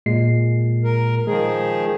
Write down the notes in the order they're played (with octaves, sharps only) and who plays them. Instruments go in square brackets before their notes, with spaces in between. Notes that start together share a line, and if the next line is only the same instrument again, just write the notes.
[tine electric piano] A#2 G#3 C7
[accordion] A#4
[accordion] D#3 F3 G#4 [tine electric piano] G#3